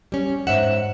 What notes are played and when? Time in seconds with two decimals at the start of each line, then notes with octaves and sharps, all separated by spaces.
0.12 G3 C#4
0.47 G#2 C5 C#5 E5 F#5 E7